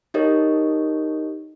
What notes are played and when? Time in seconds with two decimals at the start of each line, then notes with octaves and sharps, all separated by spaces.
0.14 D#4 G4 A4 A#4 C#5 D#5